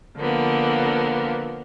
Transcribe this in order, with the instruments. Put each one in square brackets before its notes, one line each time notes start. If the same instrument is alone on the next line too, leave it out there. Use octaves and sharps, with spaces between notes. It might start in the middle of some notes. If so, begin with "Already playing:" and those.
[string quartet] D3 F3 A#3 B3